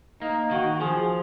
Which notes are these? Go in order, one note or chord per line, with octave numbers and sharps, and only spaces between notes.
A#3 D#4
D#3 F#4
F3 G#4